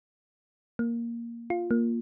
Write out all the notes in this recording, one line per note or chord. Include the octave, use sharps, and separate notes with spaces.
A#3
F4
A#3